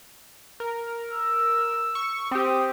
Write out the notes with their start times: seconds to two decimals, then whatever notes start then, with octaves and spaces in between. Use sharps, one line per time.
0.60 A#4
1.08 E6
1.95 C#6
2.31 C4 G4 D#6